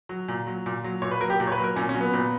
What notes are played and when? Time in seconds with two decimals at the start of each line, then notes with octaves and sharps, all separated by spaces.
0.09 F#3
0.28 A#2
0.47 F#3
0.66 A#2
0.84 F#3
1.02 A#2 C#5
1.11 B4
1.21 F#3 A#4
1.30 G4
1.40 A#2
1.47 C#5
1.52 B4
1.58 F#3
1.64 A#4
1.76 A#2 C#4
1.89 C#4
1.94 F#3
2.01 B3
2.13 A#2